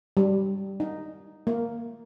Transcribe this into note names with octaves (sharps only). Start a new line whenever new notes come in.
G3
D#4
A#3